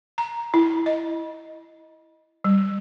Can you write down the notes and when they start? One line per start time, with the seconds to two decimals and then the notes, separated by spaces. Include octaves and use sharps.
0.18 A#5
0.54 E4
0.86 D#5
2.44 G3